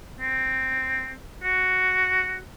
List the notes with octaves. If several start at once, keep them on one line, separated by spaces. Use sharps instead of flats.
C4
F#4